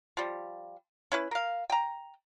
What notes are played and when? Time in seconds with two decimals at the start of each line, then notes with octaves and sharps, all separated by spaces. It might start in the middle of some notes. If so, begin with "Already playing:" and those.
0.17 F3 G3
1.12 C#4 E4 B4
1.31 A#4 F5
1.70 G5 A#5